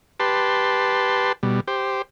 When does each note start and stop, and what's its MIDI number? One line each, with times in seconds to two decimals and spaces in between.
0.20 1.32 67
0.20 1.32 71
0.20 1.32 81
0.20 1.32 84
1.43 1.60 47
1.43 1.60 55
1.68 2.02 67
1.68 2.02 72